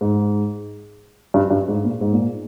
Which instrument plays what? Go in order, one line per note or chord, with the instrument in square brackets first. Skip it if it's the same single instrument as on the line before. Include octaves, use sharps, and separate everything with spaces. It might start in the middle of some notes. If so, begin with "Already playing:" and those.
[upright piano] G#2
G2
G2
G#2
A#2
G#2
A#2